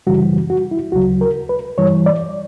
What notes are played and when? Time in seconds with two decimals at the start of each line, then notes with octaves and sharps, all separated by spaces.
0.07 F#2 C#3 E3 G3 F#4
0.50 F#4
0.71 E4
0.92 D2 C#3 F#3 F#4
1.21 A#4
1.49 B4
1.78 G2 E3 G3 C#5
2.06 D5